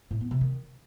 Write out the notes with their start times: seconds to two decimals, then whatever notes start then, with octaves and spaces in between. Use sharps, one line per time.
0.11 A2
0.21 B3
0.31 C3
0.41 D#3